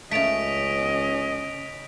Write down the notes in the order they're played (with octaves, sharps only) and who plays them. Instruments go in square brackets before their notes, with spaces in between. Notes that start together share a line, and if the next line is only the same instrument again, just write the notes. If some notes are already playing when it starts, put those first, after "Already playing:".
[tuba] C#2 [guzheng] C#3 A3 [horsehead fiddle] C#4 D#5 [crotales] B6 D7 F7